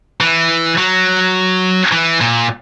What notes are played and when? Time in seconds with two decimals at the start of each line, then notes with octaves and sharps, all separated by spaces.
0.20 E3
0.78 F#3
1.92 E3
2.21 A#2